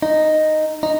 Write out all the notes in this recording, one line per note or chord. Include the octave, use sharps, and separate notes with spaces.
D#4
D#4